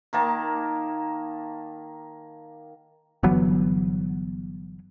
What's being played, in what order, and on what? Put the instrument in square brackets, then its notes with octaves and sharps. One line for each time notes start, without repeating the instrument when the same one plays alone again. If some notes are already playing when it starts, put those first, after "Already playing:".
[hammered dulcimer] D#3 A#3 A5
[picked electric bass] G1 E3 F#3 B3